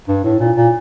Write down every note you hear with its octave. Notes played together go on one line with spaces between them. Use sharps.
G2
A2
A#2
A#2